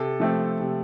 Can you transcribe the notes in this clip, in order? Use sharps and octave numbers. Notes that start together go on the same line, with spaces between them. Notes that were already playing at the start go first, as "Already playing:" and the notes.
Already playing: C3 A4
F3 A3 C4
C3